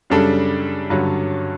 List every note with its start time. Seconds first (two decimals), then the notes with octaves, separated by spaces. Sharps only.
0.10 F#2 C#3 G3 D4 A4
0.90 G2 D3 F#3 C#4